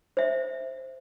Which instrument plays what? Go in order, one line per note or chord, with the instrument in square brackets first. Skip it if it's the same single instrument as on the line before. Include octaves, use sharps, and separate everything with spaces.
[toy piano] C5 E5